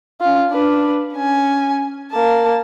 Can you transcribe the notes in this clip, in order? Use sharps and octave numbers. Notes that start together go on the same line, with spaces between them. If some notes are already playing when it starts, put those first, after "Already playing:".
C#4 F4
D4 B4
C#4 G#5
A#3 A5